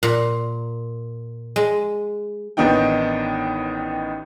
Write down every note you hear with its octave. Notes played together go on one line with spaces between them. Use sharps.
A#2
G#3
A1 D#3 B3 D4 D#4 G5